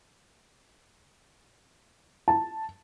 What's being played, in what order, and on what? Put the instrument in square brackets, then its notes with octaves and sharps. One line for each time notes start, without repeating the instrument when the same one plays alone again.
[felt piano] A5